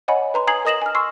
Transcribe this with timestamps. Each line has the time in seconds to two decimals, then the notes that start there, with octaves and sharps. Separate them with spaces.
0.08 C#5 D#5 F#5 G#5 B5
0.34 B4 A#5 C6
0.47 G#5 A#5 D#6 G#6 C7 F#7
0.65 A#4 D#5 D#6 A#6 E7 F#7
0.82 G#5 F6
0.95 C6 C#6 E6 C7